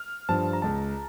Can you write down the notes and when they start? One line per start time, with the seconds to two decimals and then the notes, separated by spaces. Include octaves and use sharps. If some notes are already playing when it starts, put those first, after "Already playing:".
Already playing: F6
0.29 G2 F3 A5
0.53 A#5
0.62 C#2 A5